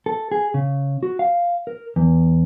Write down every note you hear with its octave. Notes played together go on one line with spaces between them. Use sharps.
A4
G#4
C#3
F#4
F5
A#4
E2